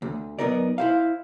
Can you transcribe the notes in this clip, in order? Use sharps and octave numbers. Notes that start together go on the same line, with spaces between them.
D2
F#2 B3 D#4 A#4 D5
E4 C5 F5